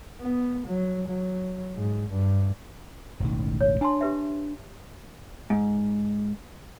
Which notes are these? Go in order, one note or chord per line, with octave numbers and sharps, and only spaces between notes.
B3
F#3
F#3
G#2
G2
E1 A1 D#3
C#5
D4 G#5 A5 C6
G4 B4 E5
G#2